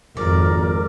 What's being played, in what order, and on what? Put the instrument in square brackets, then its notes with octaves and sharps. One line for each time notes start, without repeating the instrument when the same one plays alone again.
[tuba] G#1 [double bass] F2 [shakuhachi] A#4 [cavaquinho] D5